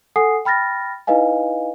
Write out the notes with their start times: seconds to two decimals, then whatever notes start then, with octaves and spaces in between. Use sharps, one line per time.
0.16 A4 F#5 G#5 D#6 C7
0.45 G5 B5 F6 A6 A#6
1.07 D#4 E4 B4 D#5 F5 G#5